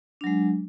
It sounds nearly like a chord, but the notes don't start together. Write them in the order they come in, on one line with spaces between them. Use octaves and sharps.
D4 F#3 G#3